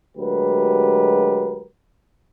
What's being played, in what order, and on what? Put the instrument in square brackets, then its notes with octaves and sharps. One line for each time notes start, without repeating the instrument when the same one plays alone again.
[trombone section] D2 F#3 G#3 G4 A#4 B4